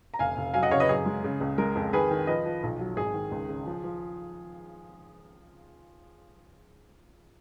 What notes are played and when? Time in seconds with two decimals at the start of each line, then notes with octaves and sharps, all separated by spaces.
0.14 A#5
0.19 F1 F5 G#5
0.37 F1
0.54 F#3 F5 G#5
0.63 D#5 F#5
0.71 C#3 C#5 F5
0.80 B4 D#5
0.89 F#2 G#4
1.06 G#3
1.24 C#3
1.40 C#2
1.58 G#3 A#4
1.76 F2
1.93 D#3 G#4 B4
2.11 D#3
2.27 F3 B4 D#5
2.46 F3
2.63 B1
2.80 F#3
2.97 G#1 G#4
3.14 D#3
3.32 C#2
3.49 C#3
3.66 F3
3.84 F3